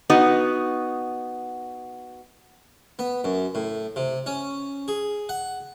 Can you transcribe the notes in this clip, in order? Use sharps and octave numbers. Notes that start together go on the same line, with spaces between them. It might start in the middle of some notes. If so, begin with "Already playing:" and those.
B3 D#4 F#4
B3
F#2
A2
C3
C#4
G#4
F#5